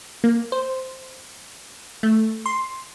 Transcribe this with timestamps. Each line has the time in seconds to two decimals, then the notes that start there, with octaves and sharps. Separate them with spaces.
0.24 A#3
0.52 C5
2.03 A3
2.46 C6